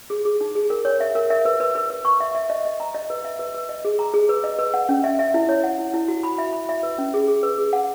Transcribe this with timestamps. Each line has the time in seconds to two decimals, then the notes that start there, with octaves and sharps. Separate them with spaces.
0.10 G#4
0.25 G#4
0.41 D#4
0.55 G#4
0.70 A#4
0.85 C#5
1.00 E5
1.15 A#4
1.30 E5
1.45 B4
1.60 B4
1.75 B4
1.90 B4
2.05 C#6
2.20 E5
2.35 E5
2.50 D#5
2.65 D#5
2.80 A#5
2.95 D#5
3.10 B4
3.25 E5
3.39 B4
3.54 B4
3.69 D#5
3.85 G#4
3.99 A#5
4.14 G#4
4.29 B4
4.44 D#5
4.59 B4
4.74 F#5
4.89 C#4
5.04 E5
5.19 E5
5.34 E4
5.49 C#5
5.64 F#5
5.78 E4
5.94 E4
6.08 F#4
6.23 B5
6.38 E5
6.53 B5
6.69 E5
6.83 B4
6.98 C#4
7.14 G#4
7.28 G#4
7.43 B4
7.58 G#4
7.73 F#5